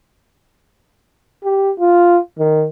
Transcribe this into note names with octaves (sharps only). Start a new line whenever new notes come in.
G4
F4
D#3